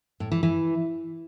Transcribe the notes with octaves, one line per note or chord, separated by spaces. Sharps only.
A2
E3
E3